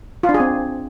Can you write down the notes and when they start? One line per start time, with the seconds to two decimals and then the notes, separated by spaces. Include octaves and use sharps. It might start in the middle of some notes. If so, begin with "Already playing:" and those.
0.23 F4
0.29 D4
0.34 G#4
0.40 C4